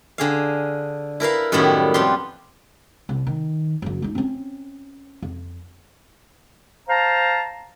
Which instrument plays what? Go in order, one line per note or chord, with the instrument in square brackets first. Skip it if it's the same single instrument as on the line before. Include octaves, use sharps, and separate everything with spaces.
[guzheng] D3 G#4 F5
E4 A#4 B4 F5
F#2 A2 D#3 G3 B3 E4
F2 B3 F4 G4 C6
[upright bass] C2
D#3
F#1 F#3
G3 D#4
C4 C#4
F2
[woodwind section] C5 F5 A5 A#5